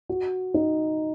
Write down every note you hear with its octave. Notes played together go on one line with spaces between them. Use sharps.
F#4
D#4